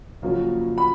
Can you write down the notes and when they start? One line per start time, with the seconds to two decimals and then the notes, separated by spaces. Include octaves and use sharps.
0.22 F#1 F#2 F3 A#3 C#4
0.78 B5